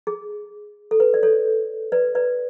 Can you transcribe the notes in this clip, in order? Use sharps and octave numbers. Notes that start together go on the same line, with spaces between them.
G#4
A4
B4
D5
A4 C#5
B4 D5
B4 D5